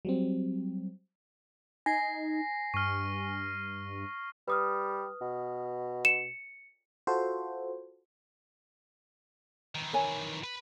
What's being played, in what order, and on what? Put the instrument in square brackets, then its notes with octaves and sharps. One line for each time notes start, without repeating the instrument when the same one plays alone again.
[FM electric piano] F#3 G3 C4
[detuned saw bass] D#4 [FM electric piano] G#5 [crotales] A#6 C7
[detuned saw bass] G2 [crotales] C#6 F6
[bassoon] G3 [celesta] B4 D#6 F6
[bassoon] B2
[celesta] C#7 [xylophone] E7
[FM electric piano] F4 F#4 A4 C5
[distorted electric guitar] D#3 E3
[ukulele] A#4 C#5 G#5
[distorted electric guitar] B4